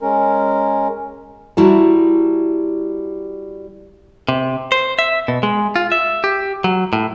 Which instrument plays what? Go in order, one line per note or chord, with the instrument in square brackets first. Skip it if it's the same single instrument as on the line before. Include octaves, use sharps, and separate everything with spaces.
[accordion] G#3 C#4 A#4
[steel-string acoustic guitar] G3 E4 F#4 A5 A#5
[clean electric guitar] C3
C5
E5
B2
G#3
F4
E5
G4
F#3
A2